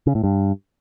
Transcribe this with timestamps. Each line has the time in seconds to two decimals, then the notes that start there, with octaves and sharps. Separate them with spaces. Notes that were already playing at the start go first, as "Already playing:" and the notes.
0.07 C#3
0.15 A2
0.24 G2